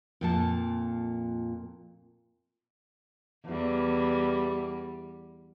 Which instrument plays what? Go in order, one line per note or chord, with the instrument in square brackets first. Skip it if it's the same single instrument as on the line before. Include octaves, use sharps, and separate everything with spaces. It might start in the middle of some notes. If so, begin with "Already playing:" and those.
[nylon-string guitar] F2 A#2 A5
[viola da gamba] E2 G3